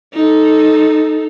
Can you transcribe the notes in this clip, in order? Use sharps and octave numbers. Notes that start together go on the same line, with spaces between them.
D#4 A4